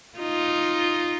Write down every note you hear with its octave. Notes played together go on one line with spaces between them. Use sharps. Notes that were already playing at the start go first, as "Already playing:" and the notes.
D#4 F4